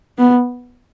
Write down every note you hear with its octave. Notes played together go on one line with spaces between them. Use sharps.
B3